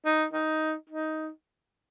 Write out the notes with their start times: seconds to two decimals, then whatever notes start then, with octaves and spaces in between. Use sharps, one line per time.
0.05 D#4
0.33 D#4
0.90 D#4